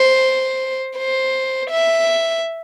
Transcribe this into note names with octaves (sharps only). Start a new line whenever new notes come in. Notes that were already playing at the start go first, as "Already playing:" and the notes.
Already playing: C5
C5
E5